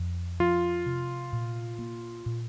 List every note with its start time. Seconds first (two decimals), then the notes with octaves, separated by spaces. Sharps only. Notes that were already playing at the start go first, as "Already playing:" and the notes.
Already playing: F2
0.40 F3 F4
0.86 C3
1.32 A#2
1.79 A#3
2.26 A#2